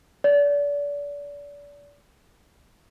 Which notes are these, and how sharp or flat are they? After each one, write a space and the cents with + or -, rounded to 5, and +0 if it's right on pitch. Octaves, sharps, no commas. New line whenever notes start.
D5 -35